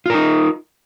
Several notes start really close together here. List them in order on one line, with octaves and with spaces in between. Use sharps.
F4 A#4 D#4